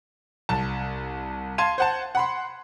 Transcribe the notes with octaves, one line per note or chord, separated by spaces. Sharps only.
C2 A5
F5 A5 C6 G#6 D#7
C5 F#5 A5
F#5 B5 C6